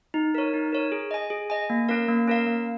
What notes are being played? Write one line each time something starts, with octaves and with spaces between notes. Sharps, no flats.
D#4
A#4 C#5
D#4
A#4 C#5
G#4
D#5 G#5
G#4
D#5 G#5
A#3
C#4 A#4 F5
A#3
C#4 A#4 F5
A#3